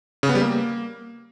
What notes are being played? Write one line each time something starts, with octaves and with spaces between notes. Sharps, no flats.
C#3
B3
G3
A#3